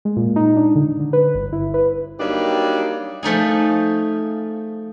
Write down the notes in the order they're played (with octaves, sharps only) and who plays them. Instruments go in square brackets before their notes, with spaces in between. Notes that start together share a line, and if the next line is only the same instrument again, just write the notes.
[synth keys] G#3
A#2
D#4
D4
D3
D3
B4
G1
E4
B4
[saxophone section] F#3 G3 A#3 D4 D#4 G4
[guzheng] F3 A3 D#4 G#4